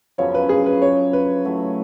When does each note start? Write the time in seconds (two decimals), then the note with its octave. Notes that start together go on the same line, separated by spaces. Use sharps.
0.18 F#2 C#3 F3 B3 C#5
0.35 B4
0.49 G#4
0.66 B4
0.82 C#5
1.13 B4
1.45 A2 F#3 A3